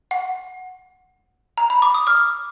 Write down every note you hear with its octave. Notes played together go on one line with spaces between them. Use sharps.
F#5
A#5
B5
D6
D#6
D6 F6